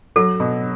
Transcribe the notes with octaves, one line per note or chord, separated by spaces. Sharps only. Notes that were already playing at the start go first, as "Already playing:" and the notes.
F#3 A4
B2